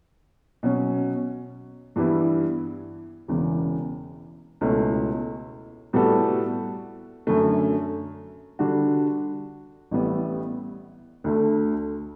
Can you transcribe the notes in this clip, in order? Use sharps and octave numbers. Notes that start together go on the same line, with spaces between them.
B2 F#3 C#4
G2 E3 G3 B3 E4
E1 E2 C#3 E3
C#2 B2 A3 C#4 E4
A2 G3 B3 F#4 A4
F#2 D3 A3
D3 G3 D4 F#4
A1 A2 G3 B3 E4
D2 D3 A3